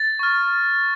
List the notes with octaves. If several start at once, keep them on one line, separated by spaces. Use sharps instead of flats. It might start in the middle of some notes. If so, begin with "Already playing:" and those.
Already playing: A6
C#6 F6